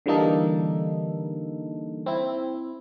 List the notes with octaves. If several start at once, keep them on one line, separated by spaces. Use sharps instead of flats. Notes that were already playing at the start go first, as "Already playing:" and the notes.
D3 E3 G3 A#3 D#4 A4
C4 E4